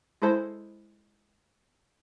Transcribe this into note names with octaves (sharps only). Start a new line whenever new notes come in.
G#3 E4 A4 C5